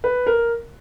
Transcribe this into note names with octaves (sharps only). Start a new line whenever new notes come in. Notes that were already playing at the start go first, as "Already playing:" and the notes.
B4
A#4